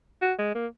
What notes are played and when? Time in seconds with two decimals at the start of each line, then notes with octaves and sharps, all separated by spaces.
0.22 F#4
0.39 G#3
0.55 A#3